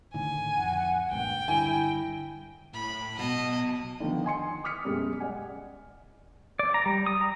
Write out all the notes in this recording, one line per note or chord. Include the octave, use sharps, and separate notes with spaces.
A2 D3 D#3 G#5
F2 F#5
C#2 G2 A#2 G5
G2 D3 E4 G#5
A2 B5
B1 B2 D#5 A5
D3 D#3 F3 B3
D#5 G#5 C6 C#7
D6 D#6 F6 B6 C#7
F#2 B2 G3 G#3
D5 D#5 F#5 G#5
D5
A#5
G3
D#6
A#5